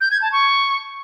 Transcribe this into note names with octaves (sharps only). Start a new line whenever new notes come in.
G6
G#6
A5
C#6